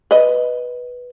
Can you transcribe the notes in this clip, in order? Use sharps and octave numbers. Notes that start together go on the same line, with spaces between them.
B4 D#5